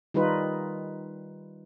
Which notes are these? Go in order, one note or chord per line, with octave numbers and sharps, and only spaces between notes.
D#3 G3 D#4 F4 B4